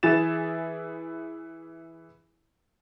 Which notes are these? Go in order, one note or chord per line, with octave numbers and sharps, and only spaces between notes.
E3 E4 G#4 A6 E7